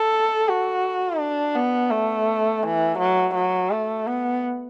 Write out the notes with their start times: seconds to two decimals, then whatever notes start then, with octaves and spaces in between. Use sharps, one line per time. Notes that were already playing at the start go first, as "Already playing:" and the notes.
Already playing: A4
0.48 F#4
1.20 D4
1.55 B3
1.91 A3
2.63 E3
2.99 F#3
3.35 F#3
3.70 A3
4.07 B3